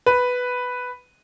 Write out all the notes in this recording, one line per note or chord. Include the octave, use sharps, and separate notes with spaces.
B4